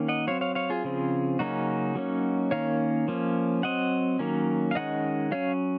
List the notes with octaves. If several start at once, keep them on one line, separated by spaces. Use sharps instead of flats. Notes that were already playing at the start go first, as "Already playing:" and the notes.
Already playing: D#3 A#3 C#4
D#5 F#5
F#3 C4 C#5 F5
C#5 F5
C#5 F5
F4 G#4
C#3 F3 C4
C#3 F#3 A#3 C#4 D#4 F#4
F#3 A#3 C#4
D#3 A#3 C#4 C#5 F5
F3 A#3 C#4
F#3 C4 D#5 F#5
D#3 F#3 A#3 C#4
F5
D#3 G#3 C#4 D#5 F#5
F#3 C#4 C#5 F5